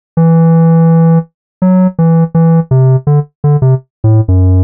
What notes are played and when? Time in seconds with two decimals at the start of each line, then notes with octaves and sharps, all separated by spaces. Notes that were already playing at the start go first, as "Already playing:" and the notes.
0.17 E3
1.62 F#3
1.99 E3
2.35 E3
2.71 C3
3.07 D3
3.44 D3
3.62 C3
4.04 A2
4.28 F#2